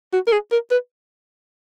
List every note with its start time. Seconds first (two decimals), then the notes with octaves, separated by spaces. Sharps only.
0.13 F#4
0.27 A#4
0.32 G#4
0.52 A#4
0.71 B4